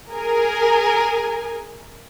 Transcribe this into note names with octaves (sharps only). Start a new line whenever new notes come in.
G#4 A#4 G#5